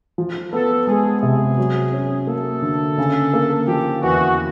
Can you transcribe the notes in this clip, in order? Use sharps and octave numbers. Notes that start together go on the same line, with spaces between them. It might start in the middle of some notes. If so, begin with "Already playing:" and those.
F3
B3 A4
G#3 G#4
C3 G#4
F#3
C#4
A#3 A4
D3
C#3
A#3
F3 G4
E2 F#4